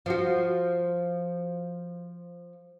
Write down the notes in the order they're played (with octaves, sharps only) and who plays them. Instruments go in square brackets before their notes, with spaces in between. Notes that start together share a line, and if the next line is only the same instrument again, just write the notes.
[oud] F3 F#4